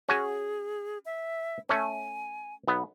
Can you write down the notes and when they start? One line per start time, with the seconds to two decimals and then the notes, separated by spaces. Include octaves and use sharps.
0.09 C#4 F#4 G#4 G#5
1.05 E5
1.69 A3 C#4 G#5
2.68 B1 B3